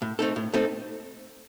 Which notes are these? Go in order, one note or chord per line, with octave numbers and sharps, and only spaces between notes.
A2
A3 C4 D#4 A4
A2
A3 C4 D#4 A4